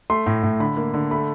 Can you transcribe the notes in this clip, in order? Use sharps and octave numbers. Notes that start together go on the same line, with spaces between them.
A3 C6
A2
A2
D3 B5
A#3
D3
A3 B5